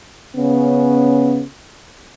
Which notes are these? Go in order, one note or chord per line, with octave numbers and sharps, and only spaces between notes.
C#3 B3 C#4